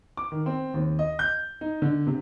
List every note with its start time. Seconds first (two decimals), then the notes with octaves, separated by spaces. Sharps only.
0.17 D6
0.32 D#3
0.46 C4
0.74 D#2
0.99 D#5
1.19 G6
1.61 D#4
1.82 D3
2.07 C3